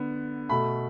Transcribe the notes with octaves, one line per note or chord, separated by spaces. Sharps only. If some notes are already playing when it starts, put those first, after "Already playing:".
Already playing: D3 B3
B2 A3 B5